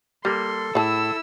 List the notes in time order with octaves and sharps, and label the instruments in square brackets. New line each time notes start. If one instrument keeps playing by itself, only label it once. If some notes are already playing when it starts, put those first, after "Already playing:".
[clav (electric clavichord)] G3 A#3 [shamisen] G4 [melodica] A4 [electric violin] C6
[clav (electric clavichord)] A2 [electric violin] E4 E6 [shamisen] G#4 A5